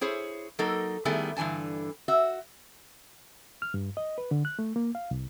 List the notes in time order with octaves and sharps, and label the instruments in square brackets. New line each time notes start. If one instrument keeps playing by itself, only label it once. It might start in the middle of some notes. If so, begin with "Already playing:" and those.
[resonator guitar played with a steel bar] E4 G#4 C5 C#5
F#3 A#3 D#4 A4 A#4
D#3 G3 A3 B3 E4 G#4
G2 D3 E3 G#5 A5
F#4 E5
[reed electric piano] F6
G2
D#5
B4
D3
F#6
A3
A#3
F5
C2